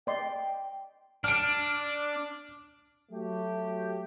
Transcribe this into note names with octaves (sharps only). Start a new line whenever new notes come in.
D5 D#5 G5 C6
D4 F6 D7
F#3 A3 G4